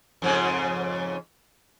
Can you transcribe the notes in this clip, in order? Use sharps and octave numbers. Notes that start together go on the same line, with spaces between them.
F2 G#2 C#3